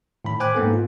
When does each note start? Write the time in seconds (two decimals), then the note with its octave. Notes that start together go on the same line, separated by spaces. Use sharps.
0.25 A2 D#3 B5
0.40 C5 G5 G#5 D6 F#6
0.55 G#2 A#3 B3 A4
0.73 F4